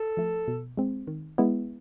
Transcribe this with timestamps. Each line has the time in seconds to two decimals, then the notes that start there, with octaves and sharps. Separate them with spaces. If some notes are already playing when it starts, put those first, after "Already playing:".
Already playing: A4
0.17 F3 A3
0.48 B2
0.77 G#3 C4
1.07 D#3
1.38 G#3 B3 E4